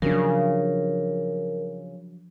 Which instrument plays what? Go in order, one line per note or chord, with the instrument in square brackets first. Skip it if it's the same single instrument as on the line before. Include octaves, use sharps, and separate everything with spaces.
[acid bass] C#3 [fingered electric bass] F3 F#3 D4 [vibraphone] A#4